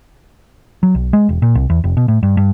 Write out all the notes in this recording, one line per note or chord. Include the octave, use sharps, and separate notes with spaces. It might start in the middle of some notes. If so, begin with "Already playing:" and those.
F#3
B1
G#3
E1
A#2
C2
E2
F1
B2
A2
G2
G2